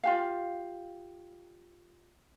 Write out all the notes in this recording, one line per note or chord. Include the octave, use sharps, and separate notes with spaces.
F4 G4 F5